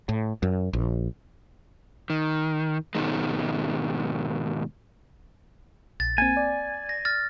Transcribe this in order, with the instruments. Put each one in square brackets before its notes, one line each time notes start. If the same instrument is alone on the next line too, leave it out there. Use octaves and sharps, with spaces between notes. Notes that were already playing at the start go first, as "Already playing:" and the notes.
[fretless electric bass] A2
F#2
A#1
[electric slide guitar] D#3
G#2 B2 D#3 G#3
[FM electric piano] A#1 [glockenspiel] A6
[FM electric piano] A#3 C4 [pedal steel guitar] G#5
[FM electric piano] D5
[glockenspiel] A#6
F6 A6